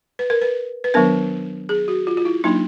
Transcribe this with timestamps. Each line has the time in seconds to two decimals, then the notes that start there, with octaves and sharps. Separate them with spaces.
0.19 B4
0.30 A#4
0.42 B4
0.84 B4
0.94 D#3 F#3 B3 D4 A#4
1.69 G#4
1.88 F#4
2.07 F4
2.17 F4
2.25 E4
2.44 F#3 A#3 D4 D#4